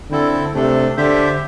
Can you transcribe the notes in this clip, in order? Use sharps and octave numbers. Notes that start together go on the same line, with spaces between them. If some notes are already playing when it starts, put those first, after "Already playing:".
D3 C4 E4 A4
C3 A3 D4 A4
D3 G4 C5 E5